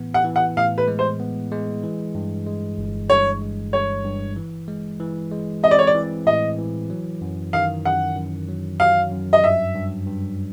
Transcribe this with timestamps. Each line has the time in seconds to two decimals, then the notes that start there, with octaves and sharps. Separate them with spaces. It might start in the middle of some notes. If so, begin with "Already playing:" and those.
Already playing: A2 E3 B3
0.14 F#5
0.24 E3
0.36 F#5
0.56 A2 F5
0.78 B4
0.88 G#3
0.99 C5
1.20 B3
1.52 G#3
1.83 E3
2.15 G2
2.47 G#3
2.78 G1
3.10 G2 C#5
3.42 G#3
3.73 G2 C#5
4.05 G2
4.36 E3
4.68 G#3
5.00 E3
5.31 G#3
5.63 C4 D#5
5.71 D5
5.79 C#5
5.87 D5
5.95 E3
6.27 A2 D#5
6.58 E3
6.90 F#3
7.21 F#2
7.53 D#3 F5
7.85 F#2 F#5
8.16 F#2
8.48 F#3
8.80 F#3 F5
9.12 F#2
9.33 D#5
9.43 G2 E5
9.75 G2
10.07 G2